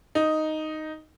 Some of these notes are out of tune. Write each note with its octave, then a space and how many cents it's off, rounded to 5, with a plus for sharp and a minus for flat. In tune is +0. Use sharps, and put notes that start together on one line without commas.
D#4 +0